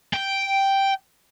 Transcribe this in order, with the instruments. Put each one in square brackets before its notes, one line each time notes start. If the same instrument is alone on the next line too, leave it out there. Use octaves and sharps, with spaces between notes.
[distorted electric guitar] G5